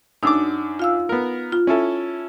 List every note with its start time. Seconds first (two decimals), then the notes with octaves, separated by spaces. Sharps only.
0.23 F#2 D4 D#4 D6 E6
0.79 F4 F5 E6
1.09 B3 A#4
1.52 F4
1.67 C#4 E4 A4